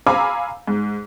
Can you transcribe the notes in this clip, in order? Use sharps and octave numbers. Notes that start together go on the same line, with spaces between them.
F5 G#5 A#5 B5 D6 E6
G#2